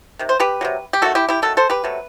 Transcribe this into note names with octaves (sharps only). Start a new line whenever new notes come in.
C3 D#3
C5
G4 B4
C3 D#3 F#3
G4
D#3 F#3 A3 F#4 A4
E4 G4
E4 G4
D#3 F#3 A3 A4
A4 C5
G4 B4
C3 F#3 A3